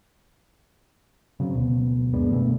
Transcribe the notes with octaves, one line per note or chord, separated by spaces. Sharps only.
C#3 F#3 B3 C4
D1 B2
F#2 G#3 B3 D4
E1 B2 D#3 A3